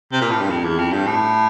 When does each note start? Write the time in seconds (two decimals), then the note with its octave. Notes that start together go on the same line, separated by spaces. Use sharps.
0.12 C3
0.21 A#2
0.31 A2
0.41 G2
0.50 F2
0.64 E2
0.79 F2
0.92 G2
1.07 A2